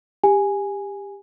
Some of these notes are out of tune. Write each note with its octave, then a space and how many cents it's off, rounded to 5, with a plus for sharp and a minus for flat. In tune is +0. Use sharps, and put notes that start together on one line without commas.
G4 +20 G#5 +0